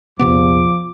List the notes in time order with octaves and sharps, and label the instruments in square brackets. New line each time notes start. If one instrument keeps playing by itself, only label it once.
[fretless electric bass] A#1 C3 B3 [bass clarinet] E2 [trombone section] F3 [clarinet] D6